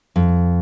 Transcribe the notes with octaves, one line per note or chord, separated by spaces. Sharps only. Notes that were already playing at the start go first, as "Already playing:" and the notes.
F2